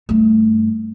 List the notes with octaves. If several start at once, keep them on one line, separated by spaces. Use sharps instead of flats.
G2 A3